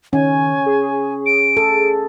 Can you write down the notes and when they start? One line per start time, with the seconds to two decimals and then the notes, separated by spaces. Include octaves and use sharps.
0.13 D#3 C#4 G#5
0.66 G#4
1.26 D7
1.57 A4